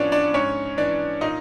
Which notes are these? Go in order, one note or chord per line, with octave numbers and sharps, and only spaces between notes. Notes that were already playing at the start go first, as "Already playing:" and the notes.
Already playing: A2 F3 B3 C#4 D4 C#5 D5
D4 D5
G#2 C#4 C#5
E3 D4 D5
A#2 D#4 D#5